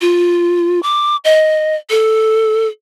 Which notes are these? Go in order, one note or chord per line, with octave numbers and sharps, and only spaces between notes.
F4
D6
D#5
A4